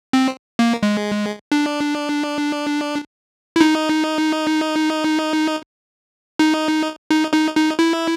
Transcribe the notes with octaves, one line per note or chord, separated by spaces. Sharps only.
C4
A#3
G#3
D4
E4
D#4
D#4
D#4
D#4
D#4
E4